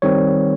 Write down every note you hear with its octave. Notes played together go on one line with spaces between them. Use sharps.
D#3 G3 C4 C#5